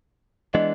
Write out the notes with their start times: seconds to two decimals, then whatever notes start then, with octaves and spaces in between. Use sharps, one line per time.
0.54 E3 G#3 B3 D4 D#5